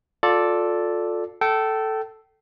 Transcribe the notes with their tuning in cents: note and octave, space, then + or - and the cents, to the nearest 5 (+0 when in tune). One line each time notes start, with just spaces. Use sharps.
F4 +30 A4 +0 D5 +0
A4 +0 G5 -30